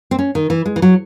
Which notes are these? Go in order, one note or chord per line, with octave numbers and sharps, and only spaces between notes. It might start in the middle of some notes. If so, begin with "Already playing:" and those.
C4
C#4
D#3
E3
G#3
E3
F#3